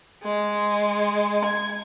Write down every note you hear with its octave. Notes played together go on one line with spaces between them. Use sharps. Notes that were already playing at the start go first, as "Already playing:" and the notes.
G#3
G#6